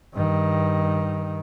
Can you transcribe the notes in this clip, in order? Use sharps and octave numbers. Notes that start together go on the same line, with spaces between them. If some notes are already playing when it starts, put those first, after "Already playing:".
G2 D#3